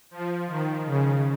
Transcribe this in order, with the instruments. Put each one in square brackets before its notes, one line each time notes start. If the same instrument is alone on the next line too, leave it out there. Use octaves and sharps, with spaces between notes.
[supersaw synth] F3
D#3
C#3